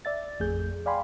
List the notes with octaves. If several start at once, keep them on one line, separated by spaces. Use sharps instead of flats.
D5 E5 A6
A1 F2 A3 G#4 G6
D5 F5 G5 G#5 B5 C6